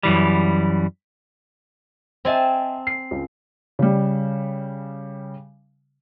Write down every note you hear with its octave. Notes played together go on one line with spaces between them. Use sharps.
F#2 E3 G3
C4 C5 D#5 E5 G#5 A5
C7
C#2
C#3 G3